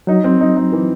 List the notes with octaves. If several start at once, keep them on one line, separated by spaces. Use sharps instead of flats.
F#3 D#4
C4
D#4
D#4
E3